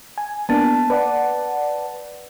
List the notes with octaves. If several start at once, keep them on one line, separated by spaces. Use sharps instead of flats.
G#5
A#3 B3 D4 A5 A6
B4 D5 F#5